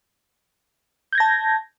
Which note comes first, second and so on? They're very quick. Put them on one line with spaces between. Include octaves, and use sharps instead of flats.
G6 G#6 A#6 A5